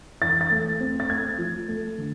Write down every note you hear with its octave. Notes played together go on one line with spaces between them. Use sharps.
E3 A6
A6
A3
C4
A6
A3 G#6
F3
A3
D3